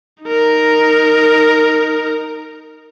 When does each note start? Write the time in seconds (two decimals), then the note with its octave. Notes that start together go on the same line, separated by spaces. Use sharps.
0.23 D#4 A#4